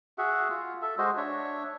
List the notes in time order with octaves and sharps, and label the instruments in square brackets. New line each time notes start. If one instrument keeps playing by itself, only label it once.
[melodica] F#4 G#4 E5 F#5
F4
A4 E5
G#3 F#4 C5 D#5
D4 C#5 E5